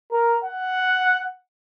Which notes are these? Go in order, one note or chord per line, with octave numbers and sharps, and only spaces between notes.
A#4
F#5